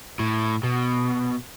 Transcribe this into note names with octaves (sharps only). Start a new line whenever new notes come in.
A2
B2